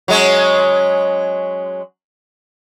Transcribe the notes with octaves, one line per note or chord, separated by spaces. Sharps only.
F#3 G#3 C#4